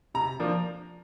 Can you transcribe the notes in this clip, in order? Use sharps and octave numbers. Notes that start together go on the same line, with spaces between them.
C3 A#5
F3 A#3 D4